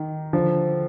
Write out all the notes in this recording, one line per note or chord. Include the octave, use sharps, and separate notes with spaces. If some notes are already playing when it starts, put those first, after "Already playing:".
Already playing: D#3
D3 F3